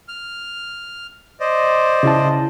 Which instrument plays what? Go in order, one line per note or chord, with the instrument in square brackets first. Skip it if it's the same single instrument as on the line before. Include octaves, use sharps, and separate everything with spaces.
[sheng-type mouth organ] F6
C5 D5 D#5
[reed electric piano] C#3 E4 A5